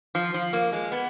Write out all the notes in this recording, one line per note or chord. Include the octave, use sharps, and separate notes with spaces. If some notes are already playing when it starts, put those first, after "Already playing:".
F3
F3
A#3
G#3
B3